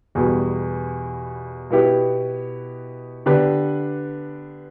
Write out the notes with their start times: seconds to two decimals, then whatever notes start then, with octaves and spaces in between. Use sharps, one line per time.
0.15 E2 B2 G3
1.70 B2 B3 E4 G4
3.26 D3 B3 D4 G4 B4